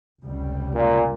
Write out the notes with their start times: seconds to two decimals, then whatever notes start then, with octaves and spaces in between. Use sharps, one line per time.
0.22 F1 C#2 G3
0.75 A#2